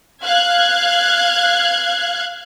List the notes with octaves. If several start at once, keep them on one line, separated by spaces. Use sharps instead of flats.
F5 F#6 G#6